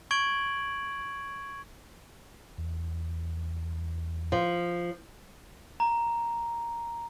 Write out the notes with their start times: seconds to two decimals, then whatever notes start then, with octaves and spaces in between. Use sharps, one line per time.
0.11 C#6 G#6 D7 F#7
2.58 E2
4.32 F3
5.80 A#5